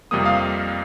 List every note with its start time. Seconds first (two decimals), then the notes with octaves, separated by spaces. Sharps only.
0.11 F2 C3 G3 A#3 D#6
0.25 F5